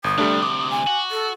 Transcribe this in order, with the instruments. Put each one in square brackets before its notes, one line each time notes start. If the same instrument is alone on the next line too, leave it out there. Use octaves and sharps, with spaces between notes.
[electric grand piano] G1 [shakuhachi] D#6
[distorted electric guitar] D2 C3 [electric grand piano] G3 A3 D4
[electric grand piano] D6
[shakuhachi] G#5
[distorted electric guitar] F#4
[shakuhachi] A4